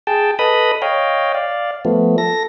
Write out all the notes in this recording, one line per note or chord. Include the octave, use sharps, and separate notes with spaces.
G#4 G5 A5
A4 B4 D#5 B5 D#6
C#5 D#5 F5 G5
D5 F5
F3 A3 B3
A4 A#6